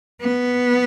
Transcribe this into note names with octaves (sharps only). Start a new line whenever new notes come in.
B3